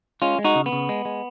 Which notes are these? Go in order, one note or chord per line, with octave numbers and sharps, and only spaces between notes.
G#3 C#4 F4
G#3
D#4 F#4
C#3
B3
C#3
G#3
G#3